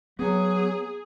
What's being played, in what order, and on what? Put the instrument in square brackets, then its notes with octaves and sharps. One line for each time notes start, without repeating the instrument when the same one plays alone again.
[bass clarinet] F#3 [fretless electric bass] B3 [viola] G#4